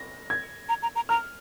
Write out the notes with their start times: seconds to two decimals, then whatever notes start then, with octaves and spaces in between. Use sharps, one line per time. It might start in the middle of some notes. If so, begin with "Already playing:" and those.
Already playing: A#6
0.30 G#6
0.69 A#5
0.82 A#5
0.96 A#5
1.09 A#5 F6